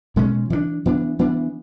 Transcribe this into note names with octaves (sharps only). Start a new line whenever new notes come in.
B2 G#3 C#4
E3 B3 D4
E3 B3 D4
E3 B3 D4